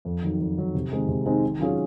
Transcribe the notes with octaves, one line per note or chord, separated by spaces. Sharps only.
F2
D#3 F#3
F2
D#3 F#3
C3
D#3 G#3 C4 D#4
C3
D#3 G#3 C4 D#4
D#3
F#3 C#4 F4 G#4